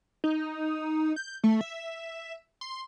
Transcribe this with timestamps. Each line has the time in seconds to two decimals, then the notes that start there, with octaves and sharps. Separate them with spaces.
0.24 D#4
1.16 G6
1.44 A3
1.61 E5
2.61 C6